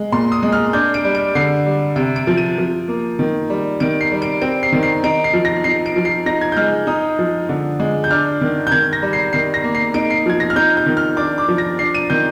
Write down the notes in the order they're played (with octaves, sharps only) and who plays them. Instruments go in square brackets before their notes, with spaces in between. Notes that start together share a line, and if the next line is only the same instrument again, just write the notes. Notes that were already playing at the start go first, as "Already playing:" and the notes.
Already playing: [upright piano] G#3
A#2 C6
D#6
G#3
F6
D4 G6
D7
G3
D7
D3 C7
G3
C3 D7
D7
F3
D#7
F3
A#3
D#3
G3
D#3 D7
C7
G3
D7
C4 D7
C7
D#3
C7
D#4 D7
C7
F3
A#6
D#4 C7
D7
F3
C7
D#4 A#6
G#6
G6
G#3 F6
D#4 D#6
F3
D3
G#3
G6
D4 F6
D#3
G6
D#3 G#6
A#6
G3
C7
D#3 C7
A#6
A#3
C7
D#4 D7
C7
F3 G#6
A#6
F6
D#4 G6
G6
D#3
F6
D4 D6
D6
F3
A#6
D4 C7
D#7
D#3 G6